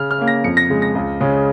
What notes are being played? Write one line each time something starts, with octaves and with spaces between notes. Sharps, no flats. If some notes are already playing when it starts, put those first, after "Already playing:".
Already playing: C#3 F6
F6
A#3 C#4
A#6
F2 C#7
A#6
C#3 G#3
A#6
C#2
C#3 G#3 C#4